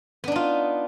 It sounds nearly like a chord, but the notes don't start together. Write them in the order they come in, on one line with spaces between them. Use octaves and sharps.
B3 D4 D#4 F4